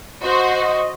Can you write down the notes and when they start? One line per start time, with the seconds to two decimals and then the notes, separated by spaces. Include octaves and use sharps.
0.23 F#4 C5 D#5